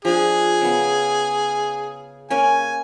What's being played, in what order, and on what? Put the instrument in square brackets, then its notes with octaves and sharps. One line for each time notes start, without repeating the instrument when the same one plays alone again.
[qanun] F3 D4 [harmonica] G#4
[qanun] C#3 B3
[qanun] A#3 C#4 [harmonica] G#5